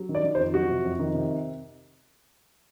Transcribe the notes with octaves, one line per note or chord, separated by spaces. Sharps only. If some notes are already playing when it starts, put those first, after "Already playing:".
Already playing: F#3
D#3
D5
D#3
C5
F2
F#3 F#4
C3
F2
D#3
C3